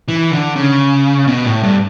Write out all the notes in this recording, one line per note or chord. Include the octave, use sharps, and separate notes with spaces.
E3
D3
C#3
B2
A2
G2